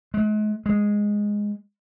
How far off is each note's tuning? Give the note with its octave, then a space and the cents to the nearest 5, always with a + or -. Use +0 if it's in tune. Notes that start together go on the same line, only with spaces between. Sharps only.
G#3 +40
G#3 -5